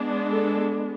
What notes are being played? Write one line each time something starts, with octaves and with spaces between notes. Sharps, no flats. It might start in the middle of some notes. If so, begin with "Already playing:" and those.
Already playing: G#3 B3 D4
A4